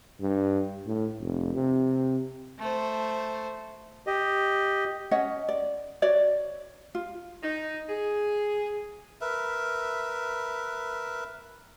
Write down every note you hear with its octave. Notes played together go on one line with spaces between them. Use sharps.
G2
A2
F1
C3
A3 C5
G4 D#5
C#4 C#5 D#5 F#5
D5
F#4 C#5 D5
F4
D#4
G#4
A#4 B4 E5